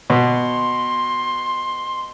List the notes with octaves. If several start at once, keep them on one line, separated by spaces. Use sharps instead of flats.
B2 C6